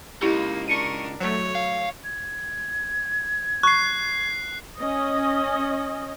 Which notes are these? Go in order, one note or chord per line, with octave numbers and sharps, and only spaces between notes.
C#2 A#3 D#4 E4 G4
D4 A#4 C#6 C#7 D#7
F#3 A3 C#5
F5
G#6
C#6 F#6 C7
C#4 D#5